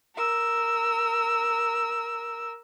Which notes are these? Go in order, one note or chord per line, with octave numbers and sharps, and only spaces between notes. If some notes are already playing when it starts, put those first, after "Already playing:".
A#4 E6